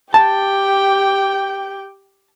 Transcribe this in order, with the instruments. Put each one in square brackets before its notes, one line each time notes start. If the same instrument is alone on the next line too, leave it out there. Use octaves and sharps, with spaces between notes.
[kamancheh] G4 G5 [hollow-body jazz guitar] A5